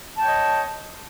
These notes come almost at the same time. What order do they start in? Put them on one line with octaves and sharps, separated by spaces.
A5 G5 C#5 D#5